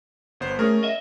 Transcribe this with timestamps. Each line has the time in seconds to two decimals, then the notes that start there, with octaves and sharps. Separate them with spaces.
0.40 G1 B3 C5
0.59 A3 C#4 G#4 A#4
0.83 D#5 E5